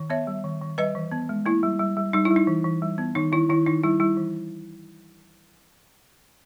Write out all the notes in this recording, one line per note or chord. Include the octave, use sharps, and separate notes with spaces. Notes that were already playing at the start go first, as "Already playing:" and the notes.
Already playing: D#3
B3 C#5 E5
G3
D#3
D#3
G3 B4 D#5
E3
B3
G#3
A#3 E4
G3
G3
G3
G3 D#4
E4
G3
D#4
E3
E3
G3
B3
D#3 D#4
D#3 E4
D#3 E4
D#3 D#4
G3 E4
G3 E4
E3